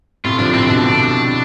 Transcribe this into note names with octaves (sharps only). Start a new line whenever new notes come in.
A2 C3 F4
D3 F3 D4
A2 C3 C4
B2 D3 D4
A2 C3